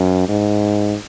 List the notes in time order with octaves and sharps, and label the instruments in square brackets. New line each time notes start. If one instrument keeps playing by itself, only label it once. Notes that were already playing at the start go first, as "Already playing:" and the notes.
Already playing: [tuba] F#2
G#2